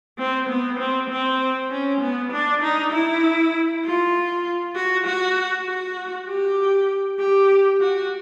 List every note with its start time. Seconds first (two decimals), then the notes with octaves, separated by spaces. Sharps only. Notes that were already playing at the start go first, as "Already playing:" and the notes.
0.18 C4
0.49 B3
0.79 C4
1.09 C4
1.71 C#4
2.01 B3
2.32 D4
2.63 D#4
2.92 E4
3.84 F4
4.76 F#4
5.06 F#4
5.68 F#4
6.28 G4
7.19 G4
7.80 F#4